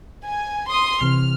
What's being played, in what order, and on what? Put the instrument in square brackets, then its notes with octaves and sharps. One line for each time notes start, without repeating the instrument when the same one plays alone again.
[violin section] G#5
C6 D#6
[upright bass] C3 E3 [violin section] F6